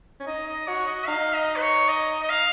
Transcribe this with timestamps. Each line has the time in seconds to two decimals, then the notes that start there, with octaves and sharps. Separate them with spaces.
0.20 C#4
0.26 D#4 D#5
0.47 D#5
0.67 F#4 C#5
0.87 D#5
1.08 D#4 F5
1.35 D#5
1.57 B4
1.62 C#5
1.89 D#5
2.23 D#5
2.30 F5